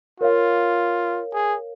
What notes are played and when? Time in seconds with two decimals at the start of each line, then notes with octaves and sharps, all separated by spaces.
0.20 F4 A#4 C#5 F5
1.33 G#4